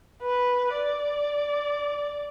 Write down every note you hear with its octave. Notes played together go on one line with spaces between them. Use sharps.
B4
D5